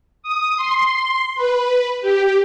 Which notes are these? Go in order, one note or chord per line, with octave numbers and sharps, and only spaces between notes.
D#6
C6
B4
G4